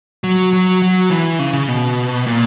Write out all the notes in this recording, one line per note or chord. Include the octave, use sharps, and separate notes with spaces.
F#3
F#3
F#3
E3
C#3
C#3
B2
A#2